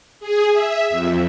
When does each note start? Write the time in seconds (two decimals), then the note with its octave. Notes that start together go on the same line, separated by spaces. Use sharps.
0.20 G#4
0.53 E5
0.90 F2